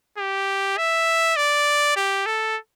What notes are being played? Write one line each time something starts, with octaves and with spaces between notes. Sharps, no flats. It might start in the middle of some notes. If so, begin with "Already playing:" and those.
G4
E5
D5
G4
A4